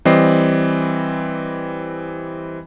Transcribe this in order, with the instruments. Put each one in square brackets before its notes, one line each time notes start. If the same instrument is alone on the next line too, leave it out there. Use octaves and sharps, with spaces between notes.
[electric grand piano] E3 G3 C4 D5 D#5 C7